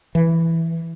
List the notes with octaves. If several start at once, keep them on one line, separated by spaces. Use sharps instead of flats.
E3